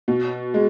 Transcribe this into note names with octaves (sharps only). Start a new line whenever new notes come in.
B2
G#3